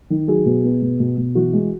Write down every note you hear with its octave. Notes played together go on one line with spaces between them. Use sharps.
D#3
F#3 G#4
B2
B3
B2
B2
B2
E3 F#4
G#3